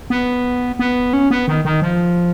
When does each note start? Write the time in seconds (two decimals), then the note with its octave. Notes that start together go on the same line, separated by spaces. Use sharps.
0.10 B3
0.79 B3
1.13 C#4
1.31 B3
1.48 D#3
1.65 D#3
1.82 F3